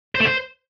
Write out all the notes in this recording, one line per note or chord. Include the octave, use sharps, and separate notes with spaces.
C5
A3
C5